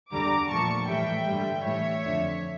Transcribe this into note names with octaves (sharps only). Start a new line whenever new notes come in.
E2 D3 G3 A#5 D6
A#2 F3 A3 A5 C#6
A2 E3 G3 E5 G5
G2 D3 G3
A2 E3 G3 C#5 E5
F2 D3 F3